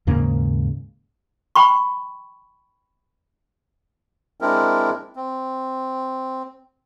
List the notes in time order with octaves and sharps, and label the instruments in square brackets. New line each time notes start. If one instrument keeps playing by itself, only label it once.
[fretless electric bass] D#2 G#2 C#3 A#3
[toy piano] G5 B5 C#6
[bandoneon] G#3 C4 D4 E4 A#4
C4